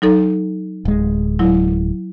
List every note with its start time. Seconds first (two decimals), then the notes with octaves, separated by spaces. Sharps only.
0.02 F#3 D#4 A4
0.85 D1 G#3
1.39 F#3 E4